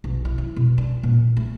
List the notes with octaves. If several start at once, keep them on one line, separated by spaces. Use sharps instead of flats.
B1
E4
E4
B2
D4
A#2
A3